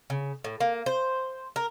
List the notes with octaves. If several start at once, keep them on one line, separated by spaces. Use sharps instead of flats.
C#3
A2
A#3
C5
A#4